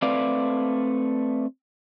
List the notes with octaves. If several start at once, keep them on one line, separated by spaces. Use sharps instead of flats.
A3 C4 B4 D5 F5